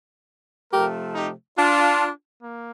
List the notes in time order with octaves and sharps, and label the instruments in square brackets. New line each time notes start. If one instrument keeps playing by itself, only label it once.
[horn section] C3 F3 A3 G4 A#4
D#4 G4
D4 F4
A#3